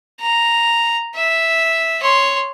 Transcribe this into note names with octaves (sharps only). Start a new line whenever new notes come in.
A#5
E5
C#5 C6